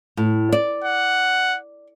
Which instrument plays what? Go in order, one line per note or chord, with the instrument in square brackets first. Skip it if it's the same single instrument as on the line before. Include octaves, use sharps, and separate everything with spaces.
[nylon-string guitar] A2
D5
[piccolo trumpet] F#5